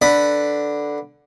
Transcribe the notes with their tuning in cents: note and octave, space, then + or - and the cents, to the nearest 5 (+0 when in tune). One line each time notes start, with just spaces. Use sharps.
D3 +0 B4 +0